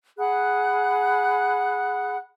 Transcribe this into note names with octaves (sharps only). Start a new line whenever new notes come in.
G#4 F#5 B5 F#6